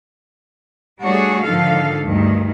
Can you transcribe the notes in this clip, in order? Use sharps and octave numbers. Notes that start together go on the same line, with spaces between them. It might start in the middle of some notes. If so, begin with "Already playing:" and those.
G3 A3 D4 F#4 G#4 C#5
G#2 D3 D#3 F3 A4 F5
D2 G2 D#3